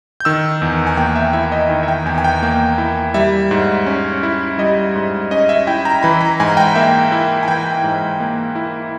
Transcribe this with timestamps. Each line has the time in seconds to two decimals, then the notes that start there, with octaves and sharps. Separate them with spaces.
0.20 G6
0.25 D#3 E6
0.62 E2
0.87 G#5
0.97 A#3 G5
1.15 E5
1.33 E4 E5
1.52 D#5
1.70 D#3
1.83 E5
1.88 G5
2.06 E2 G#5
2.18 G#5
2.24 G5
2.43 A#3
2.78 E4
3.14 G3 E5
3.51 G#2
3.86 C#4
4.23 E4
4.58 G3 D#5
4.95 G#2
5.31 C#4 D#5
5.49 E5
5.67 E4 G5
5.85 A#5
6.03 E3 B5
6.21 A#5
6.40 G#2 G#5
6.57 G5
6.75 A#3 E5
7.12 E4
7.43 G#5
7.48 E3 G5
7.84 G#2
8.20 A#3
8.55 E4